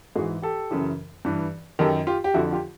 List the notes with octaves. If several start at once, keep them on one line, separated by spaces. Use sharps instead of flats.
G#2 E3 F#4 G#4
G4 A4
F#2 C#3 E3
G2 E3
F#2 D#3 G4 A4
F4 G4
G4
F2 D3 F3 E4 F#4
F4 G4